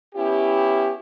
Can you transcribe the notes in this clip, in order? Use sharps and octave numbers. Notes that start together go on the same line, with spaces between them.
B3 C#4 E4 G4